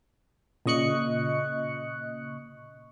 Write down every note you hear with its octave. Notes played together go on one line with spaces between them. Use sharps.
A#2 C#3 D#5 C#6 F#6 C#7